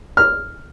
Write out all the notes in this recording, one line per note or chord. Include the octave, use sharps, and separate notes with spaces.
F6